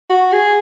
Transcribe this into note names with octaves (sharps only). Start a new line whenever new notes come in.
F#4
G#4